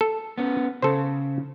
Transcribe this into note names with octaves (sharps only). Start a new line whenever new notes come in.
A4
B3 C#4
C#3 A4 C5